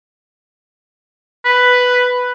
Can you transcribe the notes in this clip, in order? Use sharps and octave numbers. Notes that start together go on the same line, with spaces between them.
B4